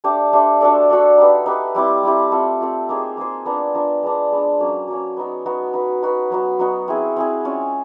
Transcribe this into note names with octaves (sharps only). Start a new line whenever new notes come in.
A3 D4 G4 C5
A3 D4 G4 C5
D4 F#4 A4 D5
D4 F#4 A4 D5
D#4 G4 B4
D#4 G4 B4
G3 C4 E4 G4
G3 C4 E4 G4
A3 C4 F4
A3 C4 F4
A#3 D#4 G#4 C5
A#3 D#4 G#4 C5
B3 D4 F4 A#4
B3 D4 F4 A#4
G#3 B3 D4
G#3 B3 D4
F#3 A#3 C#4
F#3 A#3 C#4
B3 D#4 F#4
B3 D#4 F#4
D#4 F#4 B4
D#4 F#4 B4
F#3 B3 D#4 F#4
F#3 B3 D#4 F#4
C4 E4 G#4
C4 E4 G#4
G#3 C#4 F4